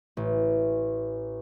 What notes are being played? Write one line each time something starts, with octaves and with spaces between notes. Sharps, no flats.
A1